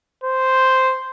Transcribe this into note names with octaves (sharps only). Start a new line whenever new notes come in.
C5